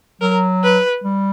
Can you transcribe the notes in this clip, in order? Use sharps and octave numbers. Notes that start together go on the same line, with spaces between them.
F#3 A#4
B4
G3